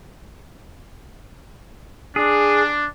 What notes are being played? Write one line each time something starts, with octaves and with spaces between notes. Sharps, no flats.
D4 G#4